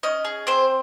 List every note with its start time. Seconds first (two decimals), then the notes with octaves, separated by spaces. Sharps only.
0.03 C#4 D#5
0.24 G#4
0.47 C4 C5